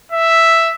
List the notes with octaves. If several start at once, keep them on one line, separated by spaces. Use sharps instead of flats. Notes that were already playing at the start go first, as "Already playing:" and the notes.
E5